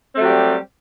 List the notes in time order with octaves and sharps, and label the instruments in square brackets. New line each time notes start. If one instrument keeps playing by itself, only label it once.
[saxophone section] C4
A3
F#3
G4
G3